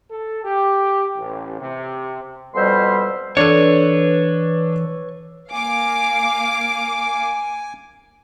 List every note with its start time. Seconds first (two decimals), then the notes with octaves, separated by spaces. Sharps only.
0.10 A4
0.44 G4
1.17 A1
1.59 C3
2.55 F2 B2 G3 C5 E5 C6
3.37 E3 D4 A4 B4 C#5
5.52 A#3 F5 G#5 D6